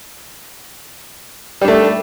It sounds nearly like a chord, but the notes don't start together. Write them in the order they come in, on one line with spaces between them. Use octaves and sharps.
G3 D4 A3